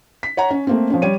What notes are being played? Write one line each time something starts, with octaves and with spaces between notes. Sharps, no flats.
B6
C#5 F#5 A#5
C#4
A3 A#3 C4
F3 C4 C#4
G3 C#5 D#7